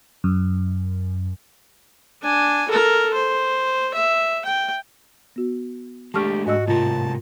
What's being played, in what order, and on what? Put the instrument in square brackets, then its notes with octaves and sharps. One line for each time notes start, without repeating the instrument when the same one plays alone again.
[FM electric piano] F#2
[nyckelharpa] D4 G#5
A4 A#4
C5
E5
G5
[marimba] B3 F#4
[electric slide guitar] G#3 A3 D4 [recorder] G4 [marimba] A5 C#6 F6
[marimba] G#2 D#5 E6 [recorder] F#4
[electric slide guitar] A2 C3 A#4 [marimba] F4 [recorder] A5